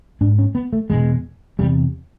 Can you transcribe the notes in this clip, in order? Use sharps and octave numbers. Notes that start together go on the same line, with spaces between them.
G#2 D4
C#4
B3
A3
E2 B2 G#3
E2 C3 G3